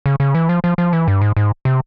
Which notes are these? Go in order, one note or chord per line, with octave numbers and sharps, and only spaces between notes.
C#3
C#3
E3
F3
F3
F3
E3
G2
G#2
G#2
C3